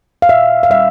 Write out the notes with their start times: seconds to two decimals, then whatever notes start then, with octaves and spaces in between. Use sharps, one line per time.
0.22 F5
0.29 A#2 E5
0.63 F5
0.70 G3 C#4 E5